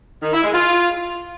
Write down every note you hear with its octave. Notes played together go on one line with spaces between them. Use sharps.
D#3
E4
G#3
F4